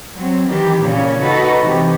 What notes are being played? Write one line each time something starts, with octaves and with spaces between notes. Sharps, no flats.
F#3 C4
D#3 E3 G4
A#2 C#3 C#4
D#4 F#4 A4 B4
C3 E3 G4